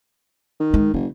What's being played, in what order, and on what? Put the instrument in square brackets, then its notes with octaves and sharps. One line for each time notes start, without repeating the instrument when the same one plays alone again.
[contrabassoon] D#3
[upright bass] G#3
[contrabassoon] F#1 [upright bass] C#3